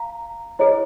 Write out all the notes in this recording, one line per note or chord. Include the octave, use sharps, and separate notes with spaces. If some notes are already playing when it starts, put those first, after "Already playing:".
Already playing: F5 A#5
E4 G#4 B4 C#5 D#5